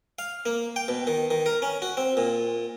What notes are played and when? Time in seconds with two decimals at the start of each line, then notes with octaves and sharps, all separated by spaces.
0.19 F5
0.46 A#3
0.76 G5
0.88 B2
1.07 D#3
1.31 D#3
1.46 A#4
1.62 C#4
1.82 F#4
1.97 C4
2.17 A#2